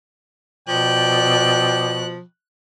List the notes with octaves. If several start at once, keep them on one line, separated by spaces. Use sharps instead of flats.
B2 F3 D5 G5 F#6